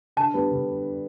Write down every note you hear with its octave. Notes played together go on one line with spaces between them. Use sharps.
D3 A5
G3 B3 D4
D3